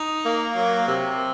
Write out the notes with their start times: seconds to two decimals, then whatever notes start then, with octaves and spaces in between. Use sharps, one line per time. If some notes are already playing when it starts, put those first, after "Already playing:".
Already playing: D#4
0.25 A#3
0.56 F#3
0.87 C3